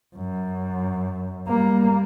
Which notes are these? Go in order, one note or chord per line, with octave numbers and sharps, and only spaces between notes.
F#2
G3 A#3